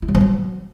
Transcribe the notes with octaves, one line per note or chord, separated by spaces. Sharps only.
E4
F#3
F3
F#3